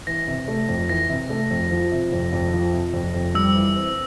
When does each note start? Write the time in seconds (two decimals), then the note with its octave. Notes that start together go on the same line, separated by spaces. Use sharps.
0.07 E3 A#6
0.28 C3
0.48 A3
0.69 F2
0.89 E3 A#6
1.10 C3
1.30 A3
1.51 F2
1.71 F3
1.92 C3
2.12 F2
2.33 F2
2.53 F3
2.73 C3
2.94 F2
3.14 F2
3.34 G3 E6
3.56 E3
3.76 C4